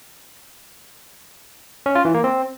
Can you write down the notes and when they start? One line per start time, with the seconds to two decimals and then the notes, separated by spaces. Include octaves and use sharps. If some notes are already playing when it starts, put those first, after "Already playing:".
1.86 C#4
1.95 F4
2.05 E3
2.14 A#3
2.24 C4